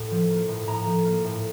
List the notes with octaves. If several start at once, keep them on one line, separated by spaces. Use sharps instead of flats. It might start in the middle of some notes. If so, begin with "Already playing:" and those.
Already playing: A2 A#3
F3
A#3
A2
A2 A#5
F3
A#3
A2